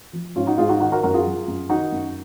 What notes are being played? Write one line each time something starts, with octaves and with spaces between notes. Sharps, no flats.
F3
G#2 C#4 F4
D#4 F#4
G#2 F4 G#4
D#4 F#4
D#3 D#4 F#4
F#4 A#4
F#2 F#4 A#4
F4 G#4
F#3
F#2
D#3 D#4 F#4
F#2